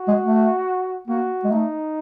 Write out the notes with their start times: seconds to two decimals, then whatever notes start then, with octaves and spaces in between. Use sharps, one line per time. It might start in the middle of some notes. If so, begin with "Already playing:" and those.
Already playing: F#4
0.08 G#3
0.22 A3
1.08 A#3 F#4
1.44 G#3
1.51 A3 D#4